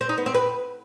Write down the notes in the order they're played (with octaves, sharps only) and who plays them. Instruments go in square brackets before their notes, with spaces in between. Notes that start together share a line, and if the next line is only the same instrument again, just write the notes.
[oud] C4
D#4
B3
C4
B4